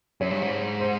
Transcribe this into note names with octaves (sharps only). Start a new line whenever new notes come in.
F#2 C#5
G2
G#2
C5